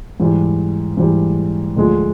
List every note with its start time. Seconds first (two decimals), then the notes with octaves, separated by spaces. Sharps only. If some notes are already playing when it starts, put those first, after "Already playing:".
0.20 G#2 E3 G3
0.97 G#2 E3 G3
1.76 D2 D3 F3 G#3